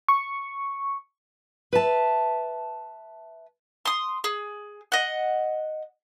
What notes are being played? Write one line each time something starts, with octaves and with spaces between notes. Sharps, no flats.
C#6
B4 E5 A5
C6 D#6
G#4
D#5 F#5